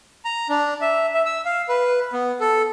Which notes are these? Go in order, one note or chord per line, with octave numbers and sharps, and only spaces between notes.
A#5
D4
E5
E5
E6
F5
B4
B3
A4